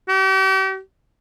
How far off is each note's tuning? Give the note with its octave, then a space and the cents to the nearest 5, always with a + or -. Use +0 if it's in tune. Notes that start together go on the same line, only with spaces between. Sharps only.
G4 -40